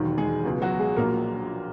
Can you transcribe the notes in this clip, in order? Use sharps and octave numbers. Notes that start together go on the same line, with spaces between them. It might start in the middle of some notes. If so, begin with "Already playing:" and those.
Already playing: E1 D#2 D#3 F#3
G#3 G#4
C#2 B2 F#3
F#3 F#4
G#3 G#4
A#1 A#2 F#3 A#3 A#4